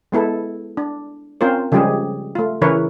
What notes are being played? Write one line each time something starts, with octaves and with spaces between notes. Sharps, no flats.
G#3 B3 E4 A4
D4
C4 C#4 F4 A#4 C5
C#3 F3 G3 G#3 G4 G#4
A3 F4
C#3 E3 E4 A#4 B4 C#5